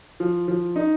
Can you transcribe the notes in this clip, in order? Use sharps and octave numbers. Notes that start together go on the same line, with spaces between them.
F3
F3
D#4